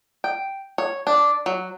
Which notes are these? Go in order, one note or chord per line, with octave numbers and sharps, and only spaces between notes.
G5
C#5
D4
F#3